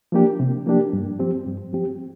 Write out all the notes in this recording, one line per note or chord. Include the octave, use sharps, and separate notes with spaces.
F3 A#3 D4 G4
C3
F3 A#3 D4 G4
G2
F3 C4 G4
G2
F3 C4 G4